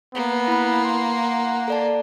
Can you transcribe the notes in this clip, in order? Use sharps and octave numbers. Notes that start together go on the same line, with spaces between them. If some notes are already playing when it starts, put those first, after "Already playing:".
A#3 B3
E4 B5
F#5 C6
A4 D5 A5